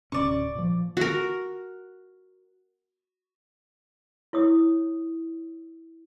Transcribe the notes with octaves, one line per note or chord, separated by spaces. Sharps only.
D1 C3 C#4 D5 C#6
A#2 F3
F#4 A#4
E4 C#5 D#6